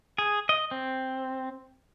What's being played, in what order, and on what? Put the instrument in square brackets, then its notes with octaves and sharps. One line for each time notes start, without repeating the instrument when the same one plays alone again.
[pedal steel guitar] G#4
D#5
C4